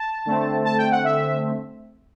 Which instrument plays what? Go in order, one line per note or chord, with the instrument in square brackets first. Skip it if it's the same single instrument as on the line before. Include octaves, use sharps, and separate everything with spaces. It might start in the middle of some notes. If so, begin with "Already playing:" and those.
Already playing: [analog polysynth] A5
D3 A3 C4
A5
G5
F#5
E5